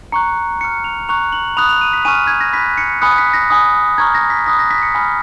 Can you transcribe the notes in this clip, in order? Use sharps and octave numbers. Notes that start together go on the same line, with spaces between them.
A#5 C#6 F#6 C#7
A#5 F6 C#7
F7
A#5 C#6 F#6 F7
F#7
B5 D#6 F#6 F7
F7
D#7
B6
G#5 C#6 F6 D#7
G#6
A#6
B5 F#6 B6
C#7
G#5 B5 D#6 F#6 C#7
B6
A#6
G#5 B5 D#6
A#5 C#6 F6 G#6
A#6
B6
B5 D#6 F#6 A#6
A#6
B6
C#7
G#5 B5 F6 B6